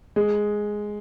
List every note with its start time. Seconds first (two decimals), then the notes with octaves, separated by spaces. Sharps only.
0.16 G#3